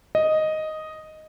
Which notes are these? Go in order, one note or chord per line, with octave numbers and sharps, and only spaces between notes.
D#5